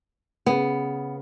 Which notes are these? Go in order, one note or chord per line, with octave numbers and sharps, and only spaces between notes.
C#3 B3